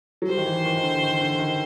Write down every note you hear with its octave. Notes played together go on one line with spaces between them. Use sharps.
F#3
G3 C5
D#3
E3
D#3
D#3
D3
D#3
D3
D#3